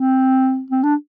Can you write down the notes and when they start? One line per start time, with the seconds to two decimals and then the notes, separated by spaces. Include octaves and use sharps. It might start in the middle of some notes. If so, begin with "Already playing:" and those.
Already playing: C4
0.71 C4
0.83 D4